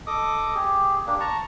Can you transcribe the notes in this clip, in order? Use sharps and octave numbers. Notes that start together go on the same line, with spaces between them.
A4 D#5 D6 D#6
G4 G#4
A#3 D4 G4
A5 A#5 C#6